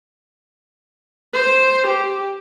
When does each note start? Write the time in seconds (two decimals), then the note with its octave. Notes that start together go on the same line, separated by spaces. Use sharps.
1.33 C5
1.87 G4